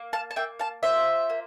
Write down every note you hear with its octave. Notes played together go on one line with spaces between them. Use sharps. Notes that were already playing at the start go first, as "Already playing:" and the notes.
Already playing: A#3
F5 A5
A5
A#3 E5 G5
F5 A5
F4 C5 E5
A#3